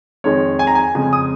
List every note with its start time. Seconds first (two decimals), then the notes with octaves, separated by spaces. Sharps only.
0.24 F2 D#3 G#3 C#5
0.59 G#5
0.67 A#5
0.75 G#5
0.95 F2 C#3 G#3 G#5
1.13 D#6